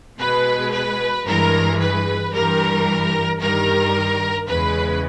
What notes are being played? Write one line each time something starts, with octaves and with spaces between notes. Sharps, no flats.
B2 G#3 B4
B4
G2 E3 G#3 A#4
B4
G2 E3 G3 A#4
G2 D#3 G3 A#4
E2 C#3 G#3 B4